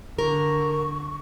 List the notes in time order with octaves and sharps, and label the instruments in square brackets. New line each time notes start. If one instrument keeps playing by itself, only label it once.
[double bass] D3 [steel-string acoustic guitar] A#4 [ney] C#6